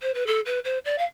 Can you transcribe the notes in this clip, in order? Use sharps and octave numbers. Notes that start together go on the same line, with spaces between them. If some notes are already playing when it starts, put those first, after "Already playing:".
C5
B4
A4
B4
C5
D5
F5